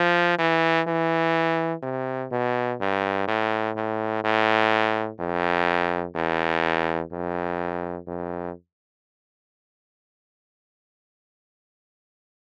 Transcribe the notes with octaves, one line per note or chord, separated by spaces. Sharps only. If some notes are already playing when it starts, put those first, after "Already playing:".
Already playing: F3
E3
E3
C3
B2
G2
A2
A2
A2
F2
E2
F2
F2